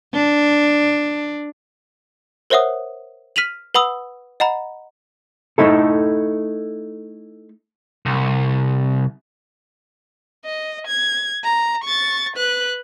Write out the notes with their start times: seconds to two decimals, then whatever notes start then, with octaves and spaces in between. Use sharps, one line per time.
0.14 D4
2.50 A#4 C5 C#5 E5 F#5 D#6
3.36 F6 B6 D#7 F7 F#7
3.74 B4 F#5 B5 D#6 E6
4.40 D#5 F#5 A#5 B5
5.58 A3 D#4 E4 A4
8.06 C2
10.45 D#5
10.87 G#6
11.44 A#5
11.84 C#6 A6
12.36 B4 F#6